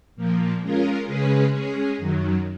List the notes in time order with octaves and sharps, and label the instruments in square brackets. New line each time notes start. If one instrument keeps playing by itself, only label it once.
[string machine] A#2 F3 A#3
G#3 C#4 F4 A#4
C#3 G#3 C#4 G#4 B4
G#3 C#4 G#4
F#2 D#3 F#3